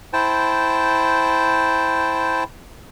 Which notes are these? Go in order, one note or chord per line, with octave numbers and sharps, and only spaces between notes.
E4 C5 G5 A5